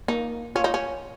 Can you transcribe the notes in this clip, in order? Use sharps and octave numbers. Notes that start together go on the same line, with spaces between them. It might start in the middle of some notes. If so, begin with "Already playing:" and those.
A#3 D#4
C#4 F4 C#5
D#4
C#4